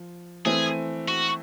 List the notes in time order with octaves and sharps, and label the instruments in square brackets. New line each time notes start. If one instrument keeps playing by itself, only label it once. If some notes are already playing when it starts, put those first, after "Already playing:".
Already playing: [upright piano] F3
[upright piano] E3 A3 C4 [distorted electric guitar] G#4
[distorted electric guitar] F#4